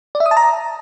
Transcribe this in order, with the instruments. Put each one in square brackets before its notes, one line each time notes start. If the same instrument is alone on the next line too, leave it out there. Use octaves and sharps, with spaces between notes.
[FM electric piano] D5
E5
D#6
A5
A#5